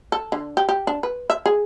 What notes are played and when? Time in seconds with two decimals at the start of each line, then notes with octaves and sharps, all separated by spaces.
0.12 A4
0.32 D3
0.57 G4
0.69 G4
0.87 D4
1.03 B4
1.30 E5
1.46 G#4